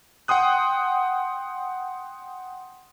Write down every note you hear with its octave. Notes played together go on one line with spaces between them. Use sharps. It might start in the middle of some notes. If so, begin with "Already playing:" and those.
F#5 G5 C6 D#6 F#6